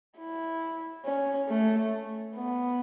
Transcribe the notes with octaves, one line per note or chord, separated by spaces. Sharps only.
E4
C#4
A3
B3